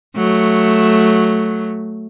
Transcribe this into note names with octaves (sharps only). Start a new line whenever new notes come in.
F#3 A3